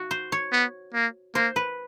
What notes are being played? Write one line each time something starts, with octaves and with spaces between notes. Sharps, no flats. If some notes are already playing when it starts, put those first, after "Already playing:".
Already playing: F#4
C5
C#5
B3
A#3
A#3 C5
B4